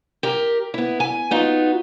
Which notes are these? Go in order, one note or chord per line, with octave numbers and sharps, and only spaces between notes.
G4 A#4
B3 E4
G#5
B3 D#4 F4 F#4